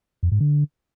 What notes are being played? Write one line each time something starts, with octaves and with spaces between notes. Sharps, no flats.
F2
G#2
D3